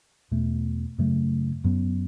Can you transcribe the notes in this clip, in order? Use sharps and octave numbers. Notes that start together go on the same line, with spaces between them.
E2 B2 A3
F#2 C#3 F#3 A3
F#2 F#3 B3